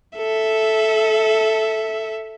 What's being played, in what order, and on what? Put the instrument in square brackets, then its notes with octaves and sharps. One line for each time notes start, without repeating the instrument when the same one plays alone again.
[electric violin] A4 E5